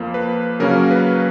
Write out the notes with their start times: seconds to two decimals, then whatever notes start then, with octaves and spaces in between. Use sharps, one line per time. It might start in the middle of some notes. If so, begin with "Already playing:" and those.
Already playing: F2 F3 A#3
0.14 B4
0.60 C#3 F#3 A#3 C#4 A#4
0.91 B4